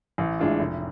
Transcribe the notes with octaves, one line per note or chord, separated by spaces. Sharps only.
A1
A2 G#3 D4 F4
F1